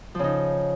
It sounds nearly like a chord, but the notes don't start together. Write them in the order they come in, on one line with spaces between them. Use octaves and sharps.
F3 C#3 D#4